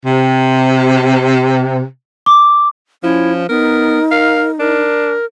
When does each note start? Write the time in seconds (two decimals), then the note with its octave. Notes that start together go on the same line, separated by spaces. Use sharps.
0.06 C3
2.26 D6
3.03 F3 C#4 E4
3.49 B3 D#4 A#4
4.11 A#4 F5
4.59 D4 A#4